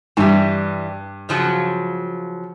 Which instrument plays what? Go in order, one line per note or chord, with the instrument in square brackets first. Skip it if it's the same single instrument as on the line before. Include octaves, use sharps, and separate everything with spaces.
[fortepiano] G2 [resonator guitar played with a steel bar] E3 G3
[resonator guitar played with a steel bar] C#3 F3 F#3